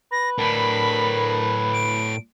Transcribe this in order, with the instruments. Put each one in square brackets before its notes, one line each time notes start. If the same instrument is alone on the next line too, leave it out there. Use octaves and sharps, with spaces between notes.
[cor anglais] B4 [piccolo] A#6
[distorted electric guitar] A2 D4 [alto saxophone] A#4 [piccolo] B5
[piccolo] D7